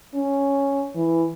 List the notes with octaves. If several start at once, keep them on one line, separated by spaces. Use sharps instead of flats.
C#4
E3